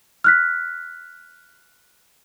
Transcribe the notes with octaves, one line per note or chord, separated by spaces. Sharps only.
F6 F#6 B6